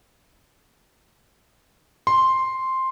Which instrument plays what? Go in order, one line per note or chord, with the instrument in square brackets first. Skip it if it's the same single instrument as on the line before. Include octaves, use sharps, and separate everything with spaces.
[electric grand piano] C6